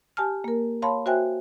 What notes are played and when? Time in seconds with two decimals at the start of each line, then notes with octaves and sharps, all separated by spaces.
0.17 G4 G#5 A5 F6
0.44 A#3 A#4
0.82 C#5 F5 A5 B5 C6
1.06 F#4 C5 E5 G5 G#5 F#6